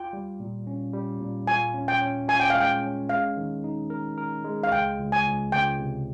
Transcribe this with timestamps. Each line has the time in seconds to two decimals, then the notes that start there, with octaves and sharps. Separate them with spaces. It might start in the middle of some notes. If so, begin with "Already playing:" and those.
Already playing: F4 G5
0.13 G3
0.40 A#2
0.67 C#4
0.93 G3
1.20 A#2
1.47 F4 G#5
1.74 C#4
1.88 G5
2.02 C#4
2.28 F4 G#5
2.40 G5
2.50 F5
2.55 G#3
2.60 G5
2.82 C#4
3.09 G#3 F5
3.37 D#3
3.64 D#4
3.90 A#4
4.18 A#4
4.44 G#3
4.63 F5
4.72 C#2 G5
4.99 C#2
5.12 G#5
5.26 C#2
5.52 C#2 G5
5.79 C3